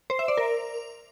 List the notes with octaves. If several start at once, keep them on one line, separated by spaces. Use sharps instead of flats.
C5
E5
D5
A#4